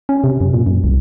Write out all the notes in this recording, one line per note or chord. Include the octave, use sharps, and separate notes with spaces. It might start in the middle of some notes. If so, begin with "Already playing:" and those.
C#4
C3
F#2
A#2
F#2
C2